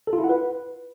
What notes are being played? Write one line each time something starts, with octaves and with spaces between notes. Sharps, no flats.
A4
F4
E4
F#5
B4